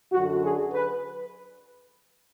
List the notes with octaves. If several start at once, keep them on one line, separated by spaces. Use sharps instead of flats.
F#2 D3 F#3 F#4
G#4
B4